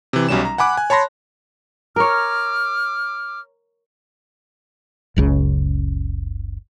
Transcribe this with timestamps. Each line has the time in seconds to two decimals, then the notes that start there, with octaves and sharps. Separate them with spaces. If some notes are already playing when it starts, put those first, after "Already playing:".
0.13 C3 E3
0.29 B1 F#3 G3 C#4 E7
0.45 A#5
0.58 F#5 G#5 B5 D6 F#6
0.77 G#5
0.90 C#5 A5 B5 C6 A#6
1.96 A#4 C#5 D6 F6
5.16 F#1 C#2 C#3